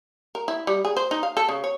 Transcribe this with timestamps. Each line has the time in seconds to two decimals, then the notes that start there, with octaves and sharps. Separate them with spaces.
0.35 A#4
0.48 E4
0.67 G3
0.85 G#4
0.97 C5
1.11 D#4
1.23 F5
1.37 A4
1.49 C#3
1.64 C#5